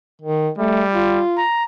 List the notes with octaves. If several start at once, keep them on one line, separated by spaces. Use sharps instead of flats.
D#3
G3 A3
F4
A#5